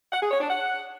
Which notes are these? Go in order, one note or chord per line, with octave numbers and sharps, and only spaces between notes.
F#5
G#4
C#5
D4
F#5